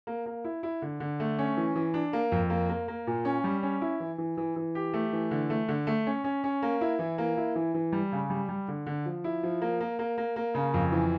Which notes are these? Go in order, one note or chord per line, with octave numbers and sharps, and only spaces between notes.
A#3
A#3
E4
E4
D3
D3
A3
C#4
E3
E3
D4
A#3
F2
A#3
A#3
A#3
A#2
C#4
G3
C#4
E4
E3
E3
E3
E3
G4
A3
E3
D3
A3
D3
A3
C#4
C#4
C#4
A#3
E4
E3
A#3
E4
E3
E3
G3
C#3
G3
G3
D3
D3
F3
E4
F3
A#3
A#3
A#3
A#3
A#3
C#3
F2
E3